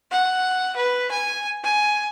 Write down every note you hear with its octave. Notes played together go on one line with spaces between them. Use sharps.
F#5
B4
G#5
G#5